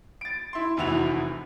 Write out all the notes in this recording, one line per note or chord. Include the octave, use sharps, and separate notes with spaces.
A6 D7
E4 C6
F1 E2 E4 F#4 F7